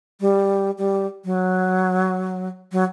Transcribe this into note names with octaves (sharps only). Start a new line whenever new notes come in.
G3
G3
F#3
F#3